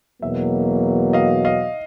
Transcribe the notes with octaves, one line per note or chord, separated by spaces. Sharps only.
E2 B2 F#3 A#3 E5
D#5 F5
D#5 F5